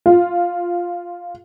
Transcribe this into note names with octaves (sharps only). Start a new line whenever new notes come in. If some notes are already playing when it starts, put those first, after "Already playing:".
F4